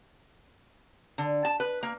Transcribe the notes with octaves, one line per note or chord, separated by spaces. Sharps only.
D3
A5
B4
A#3